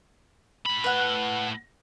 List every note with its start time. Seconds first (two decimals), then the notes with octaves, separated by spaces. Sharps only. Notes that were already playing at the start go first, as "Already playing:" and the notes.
0.66 A2 B5
0.84 B4 F#5